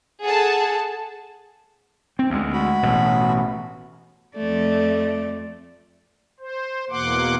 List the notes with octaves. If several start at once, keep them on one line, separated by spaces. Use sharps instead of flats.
G#4 A4 F#5 A5
C4
D2 G#3
F#4 B5
A1 B2
F2 A3 D5
C5
E2 B2 A#3 F#5 C6 D6